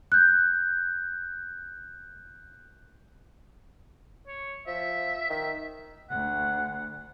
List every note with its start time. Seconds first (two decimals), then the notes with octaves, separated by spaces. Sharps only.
0.12 F#6 G6
4.27 C#5
4.67 F3 E5
5.30 D#3 E5
6.10 D2 F#5